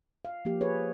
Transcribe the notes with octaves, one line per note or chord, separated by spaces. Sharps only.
F5
F3 A#3 G4
G#4 B4 C#5